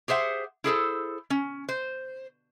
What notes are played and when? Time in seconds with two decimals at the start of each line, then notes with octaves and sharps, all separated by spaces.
0.08 G4 G#4 C5 E5 F#5
0.64 E4 G#4 A4 C5
1.30 C#4
1.69 C5